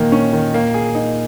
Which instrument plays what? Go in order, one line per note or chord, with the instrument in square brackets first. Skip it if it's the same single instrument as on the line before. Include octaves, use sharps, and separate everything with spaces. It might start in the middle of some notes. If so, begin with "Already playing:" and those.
Already playing: [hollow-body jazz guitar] A#2 [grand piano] D#3 A#3
[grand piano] C#4
D#3
A#3
G#4
D#4